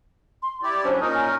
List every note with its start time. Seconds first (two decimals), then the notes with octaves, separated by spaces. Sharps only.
0.42 C6
0.63 E4 G4 D5 D6
0.85 F#3 C#4 D4 C5
1.01 A#2 C#4 D#4 A#4 D#6
1.14 G#5